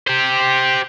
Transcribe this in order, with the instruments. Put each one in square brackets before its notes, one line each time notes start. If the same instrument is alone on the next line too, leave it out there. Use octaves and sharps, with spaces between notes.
[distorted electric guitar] G4 C5